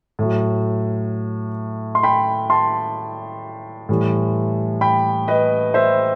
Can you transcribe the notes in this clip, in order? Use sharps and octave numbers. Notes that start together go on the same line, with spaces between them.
A2 F#3
C6
G5 B5
A5 C6
A2 E3 G3
G5 B5
B4 D#5
C5 E5